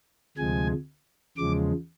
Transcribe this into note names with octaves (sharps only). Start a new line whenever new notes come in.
D2 C3 F3 G#3 G#5
E2 C#3 F3 G#3 D6